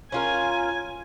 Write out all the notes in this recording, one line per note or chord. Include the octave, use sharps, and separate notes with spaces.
C#4 F4 A#4 G#5